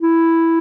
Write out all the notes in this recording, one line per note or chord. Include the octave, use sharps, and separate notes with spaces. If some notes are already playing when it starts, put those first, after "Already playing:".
E4